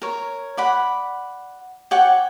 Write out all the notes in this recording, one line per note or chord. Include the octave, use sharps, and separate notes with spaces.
A#4 C#5
D5 F#5 B5
C#5 D5 F#5 G5